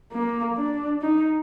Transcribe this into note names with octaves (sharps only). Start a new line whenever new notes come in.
A#3
D4
D#4